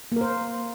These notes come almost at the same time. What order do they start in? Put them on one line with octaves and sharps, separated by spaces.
A#3 A#4 C5